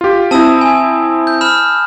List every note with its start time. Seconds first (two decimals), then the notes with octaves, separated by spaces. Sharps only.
0.01 F4 G4
0.31 C4 E4 A5 D#6 E6
0.61 G#5
1.27 G6
1.41 B5 F6 E7